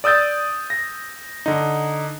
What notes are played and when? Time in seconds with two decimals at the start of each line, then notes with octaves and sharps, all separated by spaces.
0.04 D5 D#6 E6 G6 A6
0.70 A#6
1.46 D3 D#4